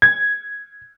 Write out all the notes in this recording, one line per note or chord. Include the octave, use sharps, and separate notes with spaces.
G#6